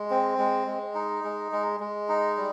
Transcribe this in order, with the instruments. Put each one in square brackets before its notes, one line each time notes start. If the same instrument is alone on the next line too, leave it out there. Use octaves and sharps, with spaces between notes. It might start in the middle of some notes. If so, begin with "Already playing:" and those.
Already playing: [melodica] G#3
C4
G#3
G#3
D#4
G#3
G#3
G#3
D#4
G3